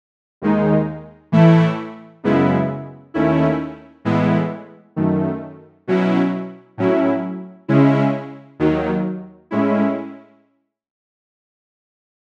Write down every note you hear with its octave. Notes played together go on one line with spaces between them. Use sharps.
D#2 D#3 G#3 D#4
A2 E3 A3 E4
F#2 C#3 G#3 B3 E4
D#2 D#3 A3 C#4 E4
A2 E3 G#3 B3 E4
F#2 D#3 A3
B2 F#3 C#4 E4
A2 F#3 C#4 E4
C#3 G#3 C#4 E4
D#2 D#3 F#3
A2 G#3 C#4 E4